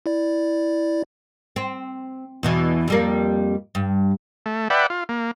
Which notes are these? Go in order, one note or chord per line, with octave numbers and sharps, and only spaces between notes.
E4 D5
C4
E2 B2 E3
F2 G3 A#3
G2
A3
B4 D5 E5 F#5 G5
F4
A#3